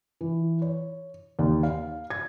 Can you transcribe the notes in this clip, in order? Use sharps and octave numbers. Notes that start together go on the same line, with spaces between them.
E3
C#5
D#2
F5
G#6